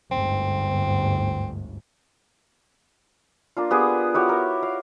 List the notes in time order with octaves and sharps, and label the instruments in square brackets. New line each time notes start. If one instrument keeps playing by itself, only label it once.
[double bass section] G1 D2 G#2 [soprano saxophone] C4
[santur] A#3 D4 F4
B3 G4 G#4
E4 F#4 G4 C#5
A#4
F5